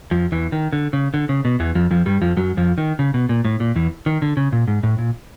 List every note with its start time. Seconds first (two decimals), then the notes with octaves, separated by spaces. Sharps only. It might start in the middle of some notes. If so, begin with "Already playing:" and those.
0.11 F2 F3
0.32 E2 E3
0.52 D#3
0.73 D3
0.93 C#3
1.14 D3
1.29 C#3
1.45 B2
1.60 E2 E3
1.75 F2 F3
1.91 F2 F3
2.06 G2 G3
2.21 F2 F3
2.37 F#2 F#3
2.57 F2 F3
2.78 D#3
2.99 C#3
3.14 B2
3.29 A#2
3.45 A2
3.60 A#2
3.76 E2 E3
4.06 D#3
4.22 D3
4.37 C#3
4.52 A#2
4.68 G#2
4.83 A2
4.99 A#2